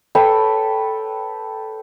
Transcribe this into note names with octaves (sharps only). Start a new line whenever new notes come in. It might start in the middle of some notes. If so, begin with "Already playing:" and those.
A4 B4 C#5 G5